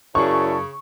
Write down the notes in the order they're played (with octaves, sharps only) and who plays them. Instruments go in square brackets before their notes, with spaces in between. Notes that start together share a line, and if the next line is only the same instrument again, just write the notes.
[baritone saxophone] F#2 [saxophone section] C#3 [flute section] E4 D5 A5 [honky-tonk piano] C#6